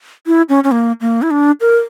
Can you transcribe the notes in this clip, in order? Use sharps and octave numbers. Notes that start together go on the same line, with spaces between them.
E4
C#4
C#4
A#3
A#3
E4
D4
A#4